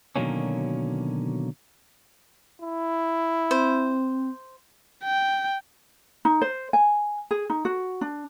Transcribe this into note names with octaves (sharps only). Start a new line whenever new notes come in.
B2 D3 D#3 F#3 A#3 C#4
E4
C4 C5
G5
D#4
C5
G#5
G#4
D#4
F#4
D4